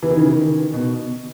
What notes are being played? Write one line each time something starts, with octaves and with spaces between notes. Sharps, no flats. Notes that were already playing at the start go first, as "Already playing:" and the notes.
E3
D#3
C#3
D#3
B2